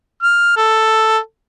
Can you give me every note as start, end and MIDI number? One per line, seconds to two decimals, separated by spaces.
0.23 0.56 89
0.56 1.18 69